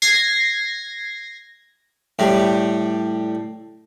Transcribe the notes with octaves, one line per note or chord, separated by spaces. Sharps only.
G#6 A#6 C7
A2 G3